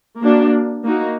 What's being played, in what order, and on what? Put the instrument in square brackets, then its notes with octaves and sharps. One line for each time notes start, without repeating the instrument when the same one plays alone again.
[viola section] A#3 D4 F#4
A#3 D#4 F#4